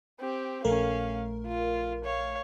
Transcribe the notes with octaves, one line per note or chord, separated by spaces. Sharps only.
C4 G4
A#1 A3 C#4 A#4 F5
F4
C#5 F5